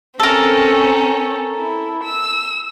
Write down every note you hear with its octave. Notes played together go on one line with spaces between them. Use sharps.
C4 C#4 A4 A#4
E4
E6